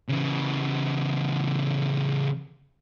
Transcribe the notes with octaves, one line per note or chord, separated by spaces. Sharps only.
C#3 E3